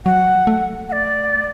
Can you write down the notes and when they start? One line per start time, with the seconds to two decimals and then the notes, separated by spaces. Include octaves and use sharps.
0.05 F#3 F#5
0.47 A3
0.88 F#5
0.92 D5